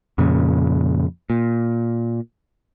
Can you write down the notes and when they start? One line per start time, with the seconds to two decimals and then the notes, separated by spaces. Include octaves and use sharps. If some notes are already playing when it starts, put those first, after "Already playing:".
0.18 F2 A#2 C#3
1.30 A#2